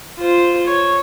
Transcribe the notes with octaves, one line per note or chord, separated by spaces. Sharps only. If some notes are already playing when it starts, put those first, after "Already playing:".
F4 C5
C#5